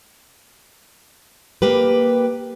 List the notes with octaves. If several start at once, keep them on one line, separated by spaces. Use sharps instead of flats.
A#3 G4 B4